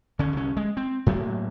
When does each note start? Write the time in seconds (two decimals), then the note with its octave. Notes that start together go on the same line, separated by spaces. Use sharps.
0.19 D3 C#4
0.33 C2 C#4
0.57 G#3
0.77 C4
1.06 A2 F#3 A3 A#3